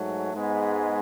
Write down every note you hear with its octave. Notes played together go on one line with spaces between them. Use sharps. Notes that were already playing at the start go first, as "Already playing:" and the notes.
Already playing: G#2 F#3 A3
G#2 G#3 B3